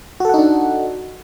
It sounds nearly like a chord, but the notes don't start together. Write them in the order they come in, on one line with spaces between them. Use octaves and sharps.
F#4 A4 F#5 D#4 D4